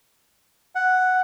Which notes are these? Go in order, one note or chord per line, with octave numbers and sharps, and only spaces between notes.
F#5